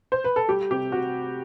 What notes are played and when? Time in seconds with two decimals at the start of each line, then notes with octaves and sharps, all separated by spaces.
0.12 C5
0.24 B4
0.36 A4
0.48 G3 G4
0.71 C3 G4
0.92 F#4